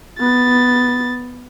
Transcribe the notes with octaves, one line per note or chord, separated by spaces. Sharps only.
B3 A6